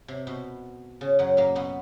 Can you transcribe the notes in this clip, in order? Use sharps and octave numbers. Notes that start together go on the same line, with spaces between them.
C3
B2
C#3
F#2 F#3
A#2 A#3
B2 B3